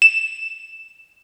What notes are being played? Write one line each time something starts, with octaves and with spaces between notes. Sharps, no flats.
E7